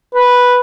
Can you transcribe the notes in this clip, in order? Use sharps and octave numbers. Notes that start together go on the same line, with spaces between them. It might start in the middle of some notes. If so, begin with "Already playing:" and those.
B4